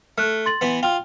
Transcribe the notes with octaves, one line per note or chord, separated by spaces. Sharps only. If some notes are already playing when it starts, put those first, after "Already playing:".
A3 F6 F#6
C6 A6 F#7
E3 B3
F4 G5 F6